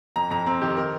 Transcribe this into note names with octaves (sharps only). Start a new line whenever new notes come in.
F2 A#5
F2 A#5
C4 A#5
D#3 G4
A#4